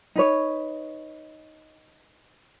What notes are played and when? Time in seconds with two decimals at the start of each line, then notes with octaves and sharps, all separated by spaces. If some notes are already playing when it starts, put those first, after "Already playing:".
0.16 D#4 B4 C#5